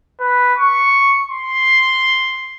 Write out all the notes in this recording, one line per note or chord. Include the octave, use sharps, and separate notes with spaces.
B4
C#6
C6